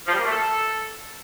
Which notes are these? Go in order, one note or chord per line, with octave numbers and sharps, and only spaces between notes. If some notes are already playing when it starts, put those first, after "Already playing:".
F3
G3
A#3
A3
A4